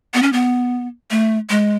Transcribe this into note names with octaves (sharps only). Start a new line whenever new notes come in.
B3
C#4
B3
A3
G#3